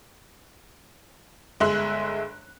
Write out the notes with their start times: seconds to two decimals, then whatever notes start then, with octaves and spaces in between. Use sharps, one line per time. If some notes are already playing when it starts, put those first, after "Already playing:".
1.60 G1 G#3 E5 C6 F#6